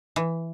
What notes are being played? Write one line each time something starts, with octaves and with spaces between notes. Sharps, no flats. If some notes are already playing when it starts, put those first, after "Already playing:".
E3